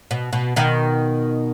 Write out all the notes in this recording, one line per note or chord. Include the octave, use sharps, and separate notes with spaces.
B2
B2
B2 D#3